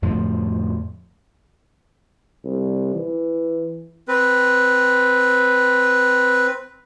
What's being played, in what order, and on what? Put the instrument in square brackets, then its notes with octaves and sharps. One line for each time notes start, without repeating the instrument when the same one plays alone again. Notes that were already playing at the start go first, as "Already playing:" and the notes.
[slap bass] F2 A2 D3 F3
[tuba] C2
E3
[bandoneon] C4 B4